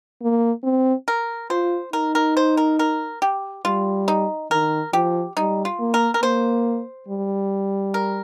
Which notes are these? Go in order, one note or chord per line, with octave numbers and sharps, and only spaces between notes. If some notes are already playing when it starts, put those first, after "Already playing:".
A#3
C4
A#4
F4 C5
D#4 A#4
A#4
C5
A#4
A#4
G4
G3 F4
D#4
D#3 A#4
F3 G4
G3 D#4
F4
A#3
A#4
A#4
A#3 C5
G3
A#4